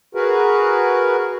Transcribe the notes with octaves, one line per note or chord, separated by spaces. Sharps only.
F#4 G#4 A#4 B4